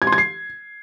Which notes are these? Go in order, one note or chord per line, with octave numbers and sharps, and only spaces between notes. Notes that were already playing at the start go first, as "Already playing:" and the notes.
G#6
C6
G#6
C7